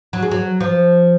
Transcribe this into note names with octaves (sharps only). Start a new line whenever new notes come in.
F#3
G#3
F#3
F3